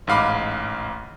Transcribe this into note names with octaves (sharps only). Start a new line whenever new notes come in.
A1 G#2 F5 B5 D6